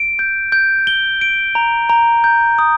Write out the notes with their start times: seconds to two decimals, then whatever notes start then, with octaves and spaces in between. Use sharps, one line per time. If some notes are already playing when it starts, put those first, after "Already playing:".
Already playing: D7
0.19 G6
0.52 G6
0.87 G7
1.21 D7
1.55 A#5
1.89 A#5
2.24 G6
2.59 D#6